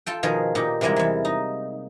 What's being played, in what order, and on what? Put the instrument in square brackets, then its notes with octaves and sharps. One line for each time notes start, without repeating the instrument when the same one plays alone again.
[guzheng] F4 A4 G5
B2 D#3 F3 G#4 A#4
A#2 D#4 G4
C3 E3 G3 G#3 A#3
E2 E3
D#4